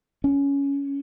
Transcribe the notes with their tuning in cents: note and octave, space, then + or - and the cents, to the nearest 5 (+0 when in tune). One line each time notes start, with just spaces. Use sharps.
C#4 +15